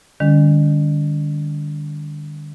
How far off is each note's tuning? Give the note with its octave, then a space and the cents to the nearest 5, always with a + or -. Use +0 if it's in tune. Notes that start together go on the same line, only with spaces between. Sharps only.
D3 +45 G3 +40 C#4 +35